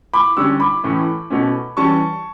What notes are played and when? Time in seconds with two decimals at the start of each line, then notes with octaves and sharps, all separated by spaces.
0.14 B5 D6
0.37 D3 G3 C#4 C#6 E6
0.60 B5 D6
0.84 A2 E3 A3 C#4
1.30 B2 A3 C#4
1.77 E3 G3 C#4 A5 C#6